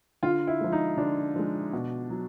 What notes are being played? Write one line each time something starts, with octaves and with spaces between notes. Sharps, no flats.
D3 F4
E4
F3 G#3
D#4
D3 D4
F3 G#3
B2
F#3